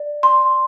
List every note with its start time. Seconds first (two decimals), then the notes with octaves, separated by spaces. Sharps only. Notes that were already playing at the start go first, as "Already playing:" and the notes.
Already playing: D5
0.23 C6